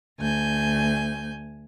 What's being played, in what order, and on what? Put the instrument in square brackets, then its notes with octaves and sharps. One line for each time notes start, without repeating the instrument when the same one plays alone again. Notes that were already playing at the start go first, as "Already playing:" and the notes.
[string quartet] D2 G#5 G6